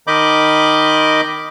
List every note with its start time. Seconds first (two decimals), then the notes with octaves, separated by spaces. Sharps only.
0.07 D#3 D#5 B5 D6 G6